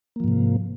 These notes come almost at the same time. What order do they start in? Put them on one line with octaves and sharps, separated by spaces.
A#3 F3 G#2 C3